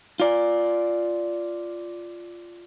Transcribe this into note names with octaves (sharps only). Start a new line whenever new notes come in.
F4 D5